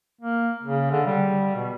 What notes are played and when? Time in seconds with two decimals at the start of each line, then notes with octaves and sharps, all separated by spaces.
0.21 A#3
0.63 C#3
0.91 D3
1.06 G3
1.55 B2